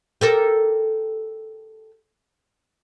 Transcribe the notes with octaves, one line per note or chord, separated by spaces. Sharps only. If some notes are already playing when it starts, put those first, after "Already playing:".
G4 A4 A#4